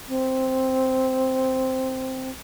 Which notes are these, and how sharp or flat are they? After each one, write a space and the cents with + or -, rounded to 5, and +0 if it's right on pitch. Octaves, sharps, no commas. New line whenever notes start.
C4 +0